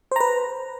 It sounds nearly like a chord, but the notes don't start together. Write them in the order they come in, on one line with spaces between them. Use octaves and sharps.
C5 A#5 B4